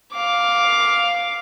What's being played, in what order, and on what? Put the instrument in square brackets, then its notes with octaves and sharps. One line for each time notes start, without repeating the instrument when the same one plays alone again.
[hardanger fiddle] F5 D6